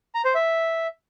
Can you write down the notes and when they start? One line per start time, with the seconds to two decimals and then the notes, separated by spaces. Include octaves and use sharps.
0.15 A#5
0.25 C5
0.35 E5